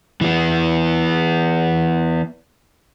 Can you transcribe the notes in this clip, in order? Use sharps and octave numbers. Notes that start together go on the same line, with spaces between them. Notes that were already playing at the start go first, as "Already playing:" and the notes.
E3 B3